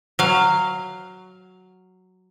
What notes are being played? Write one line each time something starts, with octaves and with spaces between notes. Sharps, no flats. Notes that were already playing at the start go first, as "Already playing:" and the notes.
F#3 F5